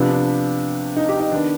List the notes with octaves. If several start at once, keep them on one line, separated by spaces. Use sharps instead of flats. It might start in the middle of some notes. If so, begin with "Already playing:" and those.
Already playing: C3 F3 B3 D4
D4
D#4
G4
D#4
D#3 B3 D4